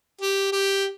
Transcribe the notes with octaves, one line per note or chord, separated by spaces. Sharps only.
G4
G4